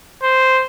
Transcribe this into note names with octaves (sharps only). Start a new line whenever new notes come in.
C5